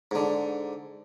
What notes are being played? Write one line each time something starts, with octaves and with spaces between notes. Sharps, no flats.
G#2 D3